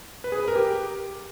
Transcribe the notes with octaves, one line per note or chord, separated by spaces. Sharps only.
B4
G#4
B4
A#4
G4